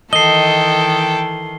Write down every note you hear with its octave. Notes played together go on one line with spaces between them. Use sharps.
D#3 E3 A4 D#5 G5 C7 G7